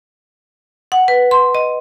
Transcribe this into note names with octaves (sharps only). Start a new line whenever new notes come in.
F#5
B4
C6
D#5